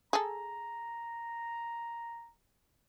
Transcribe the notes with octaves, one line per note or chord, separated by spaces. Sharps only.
G#4 A4 A#5